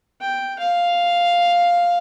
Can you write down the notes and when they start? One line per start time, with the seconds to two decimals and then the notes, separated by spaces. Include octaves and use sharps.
0.21 G5
0.60 F5